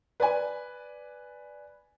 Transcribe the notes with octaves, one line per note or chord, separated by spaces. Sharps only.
B4 D5 G#5